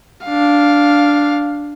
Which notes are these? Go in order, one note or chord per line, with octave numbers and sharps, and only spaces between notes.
D4 F5